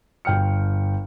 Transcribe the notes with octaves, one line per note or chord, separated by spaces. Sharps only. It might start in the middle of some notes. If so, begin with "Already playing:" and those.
G1 G5 F6 C#7